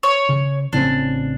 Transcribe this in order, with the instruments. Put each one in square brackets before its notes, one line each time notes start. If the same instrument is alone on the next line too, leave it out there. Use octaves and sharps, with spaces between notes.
[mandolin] C#5
[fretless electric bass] C#3
[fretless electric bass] A1 C#3 C4 [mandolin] D4